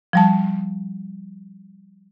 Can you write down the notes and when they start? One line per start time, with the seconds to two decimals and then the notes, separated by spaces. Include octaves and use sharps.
0.13 F3 G3 A5